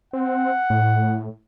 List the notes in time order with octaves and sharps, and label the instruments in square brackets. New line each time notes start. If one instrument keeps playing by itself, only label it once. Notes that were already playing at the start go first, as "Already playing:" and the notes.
[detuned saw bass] C4 [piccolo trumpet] F#5
[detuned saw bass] A2